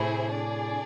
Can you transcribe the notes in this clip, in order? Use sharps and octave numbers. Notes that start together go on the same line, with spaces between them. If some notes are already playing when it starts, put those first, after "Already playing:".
Already playing: A2 C3 E4 G#4 C5
D4 G#4 D5